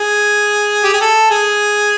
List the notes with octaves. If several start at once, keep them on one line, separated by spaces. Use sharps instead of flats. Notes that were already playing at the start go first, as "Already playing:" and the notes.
Already playing: G#4
G4
G#4
A4
G#4